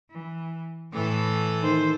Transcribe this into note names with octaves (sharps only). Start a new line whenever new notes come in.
E3
A2 E3 A4
D#3 C5